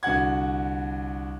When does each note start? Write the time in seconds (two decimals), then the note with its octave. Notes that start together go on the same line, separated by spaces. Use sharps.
0.03 C2 D3 F#4 F#5 G#6